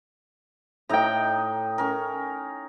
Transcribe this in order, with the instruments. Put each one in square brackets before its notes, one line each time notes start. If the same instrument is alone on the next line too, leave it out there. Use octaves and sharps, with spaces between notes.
[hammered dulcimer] A2 D#4 [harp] G5 A#5
[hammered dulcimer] C#4 A#4